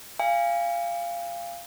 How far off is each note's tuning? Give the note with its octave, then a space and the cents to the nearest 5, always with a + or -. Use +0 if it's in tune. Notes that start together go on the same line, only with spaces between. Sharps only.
F5 -15 G#5 -30